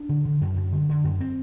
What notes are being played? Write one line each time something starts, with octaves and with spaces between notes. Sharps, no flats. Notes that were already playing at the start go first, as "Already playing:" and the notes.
Already playing: D4
D3
D3
F#2
F#2
D3
D3
F#2
C4